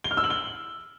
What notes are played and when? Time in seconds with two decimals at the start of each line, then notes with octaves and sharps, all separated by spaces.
0.04 G7
0.11 F6
0.17 E6
0.24 F#7
0.30 G7